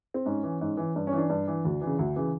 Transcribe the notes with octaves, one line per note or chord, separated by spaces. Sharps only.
C4
G#2 C#4
E3
G#2
E3
G2
C#4
E3 D4
G2
E3
D2
C#3 E3
D2
C#3 E3